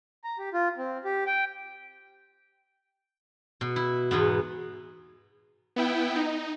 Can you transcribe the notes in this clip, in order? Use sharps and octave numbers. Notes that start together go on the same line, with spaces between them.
A#5
G4
F4
C4
G4
G5
B2
E4
E2 G#2 B2 B3
B3 E4 G5
D#4